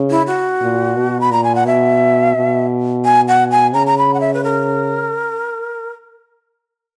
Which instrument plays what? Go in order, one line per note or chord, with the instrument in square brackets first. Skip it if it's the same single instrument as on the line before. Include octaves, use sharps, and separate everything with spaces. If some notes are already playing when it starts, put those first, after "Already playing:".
Already playing: [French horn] C#3
[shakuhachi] E4
F#4
[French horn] A#2
B2
[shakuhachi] B5
[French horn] A#2 [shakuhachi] A#5
[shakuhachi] G#5
F#5
[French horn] B2 [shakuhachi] E5
[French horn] B2
[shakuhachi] G#5
F#5
G#5
[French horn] C#3 [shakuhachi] A#5
[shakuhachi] A#5
B5
F#5
E5
B4
A#4